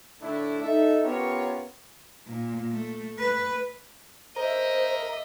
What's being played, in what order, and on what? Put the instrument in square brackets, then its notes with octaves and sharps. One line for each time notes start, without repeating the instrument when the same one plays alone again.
[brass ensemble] A2 D3 A3 D4 E4
D#4 A4 E5
B3 C#4 F4 G4 A#4 C#5
[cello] A#2
A3
B4
[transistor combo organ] A#4 [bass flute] C5 [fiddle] D#5 E5